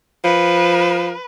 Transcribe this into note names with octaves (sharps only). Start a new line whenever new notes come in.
F3 B4